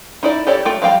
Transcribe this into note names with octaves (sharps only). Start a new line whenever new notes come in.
D#4 E4 D5
G4 A4 C#5 D5
A3 F4 G5
F3 G3 F5 G5